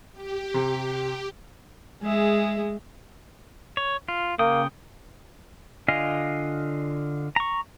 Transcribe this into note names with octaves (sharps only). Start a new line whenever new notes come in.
G4
C3
G#3 G#4 E5
C#5
F4
C#3 A#3 G5 D#6
D3 F4 D#5 F5 G#5
A#5 C#6